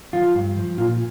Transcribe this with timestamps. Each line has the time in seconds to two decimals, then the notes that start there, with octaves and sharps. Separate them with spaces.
0.13 F3 F4
0.35 G2
0.57 F3
0.78 A#2 F4